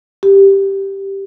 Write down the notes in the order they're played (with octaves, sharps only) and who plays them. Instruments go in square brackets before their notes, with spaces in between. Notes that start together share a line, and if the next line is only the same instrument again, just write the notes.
[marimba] G4